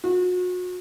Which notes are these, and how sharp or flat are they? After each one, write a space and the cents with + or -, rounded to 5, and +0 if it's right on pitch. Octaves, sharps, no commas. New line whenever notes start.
F#4 -35